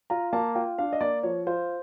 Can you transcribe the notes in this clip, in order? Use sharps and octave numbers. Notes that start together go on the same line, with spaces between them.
F4 A#5
A#3 A5
F4 G5
D4 F5
D#5
A#3 D5
F3 C#5
F4 C5